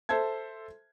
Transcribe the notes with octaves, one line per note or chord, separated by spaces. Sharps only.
A4 C5 E5 A5 G#6